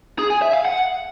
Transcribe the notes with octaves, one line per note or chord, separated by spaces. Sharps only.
G#4
G#5
E5
F5
F#5